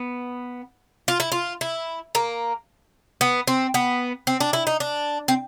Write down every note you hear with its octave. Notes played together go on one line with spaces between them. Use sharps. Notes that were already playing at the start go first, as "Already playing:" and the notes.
Already playing: B3
F4
E4
F4
E4
A#3
B3
C4
B3
C4
D4
E4
D#4
D4
C4